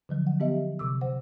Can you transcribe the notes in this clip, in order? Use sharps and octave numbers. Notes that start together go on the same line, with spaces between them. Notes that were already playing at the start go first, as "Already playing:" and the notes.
D3 F3 F#3
F#5
B3 G4 D#5 E5
C3 D6 E6
C5 F#5